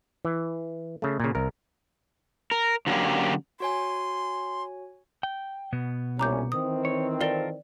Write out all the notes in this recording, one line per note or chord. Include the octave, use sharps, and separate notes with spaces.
E3
C#3 A3
A#2 C#3
C2 A#4
A#4
D3 F#3 A#3 C#4 G4
F#4 C#5 G#5 C6
G5
B2 B3
C2 A#2 C#4 A#5 D6 G6
D#3 E3 C4 D#6
C#5
F4 A4 A#4 D5 G7